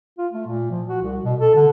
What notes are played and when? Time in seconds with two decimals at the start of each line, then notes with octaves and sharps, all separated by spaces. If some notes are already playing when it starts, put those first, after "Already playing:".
0.18 F4
0.32 A3
0.47 A#2
0.71 F3
0.88 F#4
1.02 C2
1.24 B2
1.40 A4
1.55 D3